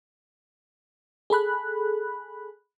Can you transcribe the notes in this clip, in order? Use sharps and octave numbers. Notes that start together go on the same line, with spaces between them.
G#4 A4 B5 F#6